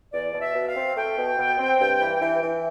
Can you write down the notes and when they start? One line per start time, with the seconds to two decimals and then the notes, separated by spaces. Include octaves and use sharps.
0.13 E2 D5
0.34 B2
0.40 E5
0.55 B2
0.69 F5
0.76 C4
0.97 A3 G5
1.17 B2
1.38 B2
1.59 C4
1.80 G2
2.01 E3
2.22 E3
2.42 E3